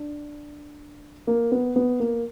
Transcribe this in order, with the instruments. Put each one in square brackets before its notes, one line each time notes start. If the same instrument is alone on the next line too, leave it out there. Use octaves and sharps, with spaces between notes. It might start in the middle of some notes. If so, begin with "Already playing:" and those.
Already playing: [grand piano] D4
A#3
B3
B3
A#3